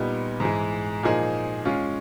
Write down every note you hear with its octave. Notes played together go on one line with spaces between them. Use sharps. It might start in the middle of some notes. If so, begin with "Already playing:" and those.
Already playing: A#2 G3 B3 D#4
G#2 E3 G#3
A#2 F3 A#3 D#4 G#4
G#3 C#4 F4